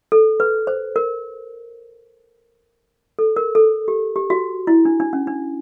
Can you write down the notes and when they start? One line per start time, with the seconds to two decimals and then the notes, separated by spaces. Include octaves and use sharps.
0.12 A4
0.40 B4
0.67 C5
0.96 A#4
3.19 A4
3.36 A#4
3.55 A4
3.88 G4
4.16 G4
4.30 F#4
4.67 E4
4.85 D4
5.00 D4
5.13 C#4
5.27 D4